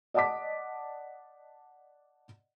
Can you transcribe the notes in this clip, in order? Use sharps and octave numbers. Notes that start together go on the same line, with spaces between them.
D5 D#5 F#5 A5 D6 B6